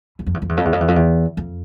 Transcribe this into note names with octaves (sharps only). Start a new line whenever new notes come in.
E2
F2
E2
F2
E2
F2
E2
F2
E2
F2
E2
F2